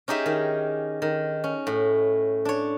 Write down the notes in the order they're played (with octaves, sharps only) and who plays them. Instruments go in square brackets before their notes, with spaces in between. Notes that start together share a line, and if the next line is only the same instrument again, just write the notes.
[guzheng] C#4 D#4 G4 G#4 E5
D#3
D#3
C#4
A2
D4 C#5